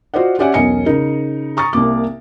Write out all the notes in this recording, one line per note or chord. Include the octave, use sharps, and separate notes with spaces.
F4 F#4 C5 D5 D#5 F#5
C#4 G4 D5 E5 F#5 G#5
E1 B1 C#4 D#5 G#5 C#7
C#3 D#4 A#4
A#5 C#6 D#6 A6
C2 C3 A#3 D6